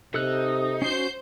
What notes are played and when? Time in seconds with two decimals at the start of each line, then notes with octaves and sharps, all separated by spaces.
0.14 C3 D#4 A4 E6 F#6
0.82 C#4 F#4 C5 G6 C7